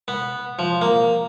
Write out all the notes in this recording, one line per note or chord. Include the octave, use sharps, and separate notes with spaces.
B3
F3
A#3